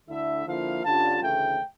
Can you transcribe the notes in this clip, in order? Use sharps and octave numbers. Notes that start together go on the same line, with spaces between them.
D2 D3 A3 E4 E5
D3 F3 A#3 E4 F5
G2 D3 G3 C#4 F4 A5
D2 C#3 E3 A3 G5